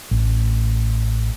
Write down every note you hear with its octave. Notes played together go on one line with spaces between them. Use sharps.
A1